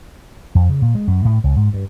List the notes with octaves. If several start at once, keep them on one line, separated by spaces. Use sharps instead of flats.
F2
C#3
A#2
G#3
F#2
A2
C#2
G#2
G2